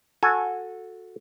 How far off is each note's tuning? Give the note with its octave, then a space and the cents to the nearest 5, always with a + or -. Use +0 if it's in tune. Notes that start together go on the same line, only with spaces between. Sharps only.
F#4 -20 A4 +0 G#5 +0